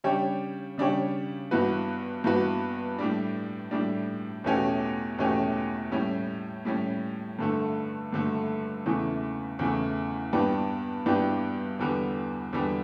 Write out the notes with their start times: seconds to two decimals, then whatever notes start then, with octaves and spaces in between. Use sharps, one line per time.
0.04 C#3 G3 D4 G4 C#5
0.78 C#3 G3 D4 G4 C#5
1.51 G2 E3 B3 F#4 B4
2.24 G2 E3 B3 F#4 B4
2.99 A2 G3 D4
3.71 A2 G3 D4
4.44 E2 B2 A3 C#4 G4
5.19 E2 B2 A3 C#4 G4
5.92 A2 G3 C#4
6.65 A2 G3 C#4
7.39 G2 D3 A3
8.12 G2 D3 A3
8.86 E2 C#3 E3 A3
9.59 E2 C#3 E3 A3
10.32 G2 E3 B3 D4 G4
11.06 G2 E3 B3 D4 G4
11.79 E2 D3 G3 B3
12.53 E2 D3 G3 B3